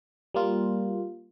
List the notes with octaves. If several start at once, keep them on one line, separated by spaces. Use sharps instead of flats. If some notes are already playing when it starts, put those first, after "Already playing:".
G3 A#3 F4